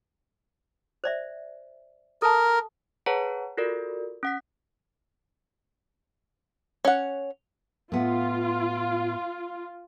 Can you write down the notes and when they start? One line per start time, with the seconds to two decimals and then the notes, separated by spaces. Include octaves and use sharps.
1.04 C5 D5 E5
2.22 A4 A#4 A5
3.06 G#4 B4 C#5 F#5 A5 A#5
3.57 F4 F#4 A4 A#4 D5
4.23 C#4 F#5 B6
6.85 C#4 F#5
7.92 A2 B3 F4